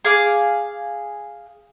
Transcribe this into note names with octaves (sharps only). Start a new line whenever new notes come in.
G#4 F5 D6